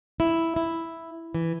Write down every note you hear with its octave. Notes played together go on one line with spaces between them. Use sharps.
E4
E4
E3